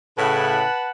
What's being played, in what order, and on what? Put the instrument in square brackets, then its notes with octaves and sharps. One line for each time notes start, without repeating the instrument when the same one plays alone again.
[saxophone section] A2 C#3 [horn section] B4 F#5 A5